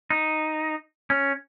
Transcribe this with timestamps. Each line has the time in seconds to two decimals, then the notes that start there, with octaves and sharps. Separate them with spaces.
0.10 D#4
1.10 C#4